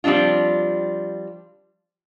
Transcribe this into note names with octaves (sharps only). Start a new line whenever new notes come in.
F3 G3 C4 D4 F4